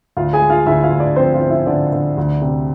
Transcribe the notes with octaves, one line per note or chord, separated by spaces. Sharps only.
D2 F4 F5
G#4 G#5
G#3
F4 F5
D2 E4 E5
F4 F5
D2
D4 D5
F3 C4 C5
F4 F5
F3
E4 E5
D3 D4 D5
D3
D2
C3